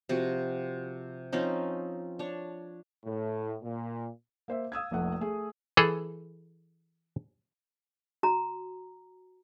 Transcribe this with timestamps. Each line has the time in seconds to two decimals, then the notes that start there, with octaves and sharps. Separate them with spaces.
0.09 C3 F3 C4 F#4
1.33 F3 C4 C#4 D#4
2.19 D4 C#5
3.05 A2
3.63 A#2
4.48 A#3 C5 E5
4.72 F5 D#6 E6 G#6
4.91 F1 A#1 A3 F#5
5.21 A3 G#4
5.77 E3 G#4 A4
8.23 F#4 A#5